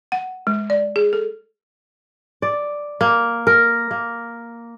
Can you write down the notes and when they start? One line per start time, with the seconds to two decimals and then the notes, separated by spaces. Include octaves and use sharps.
0.12 F#5
0.47 G#3
0.70 D5
0.96 G#4
1.13 A4
2.42 D5
3.01 A#3
3.47 A#4
3.91 A#3